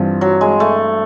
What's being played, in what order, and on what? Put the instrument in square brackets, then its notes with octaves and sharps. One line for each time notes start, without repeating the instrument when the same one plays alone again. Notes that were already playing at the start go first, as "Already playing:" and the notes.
Already playing: [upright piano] G2 E3 C4 [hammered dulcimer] F3
[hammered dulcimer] F#3
G#3
A3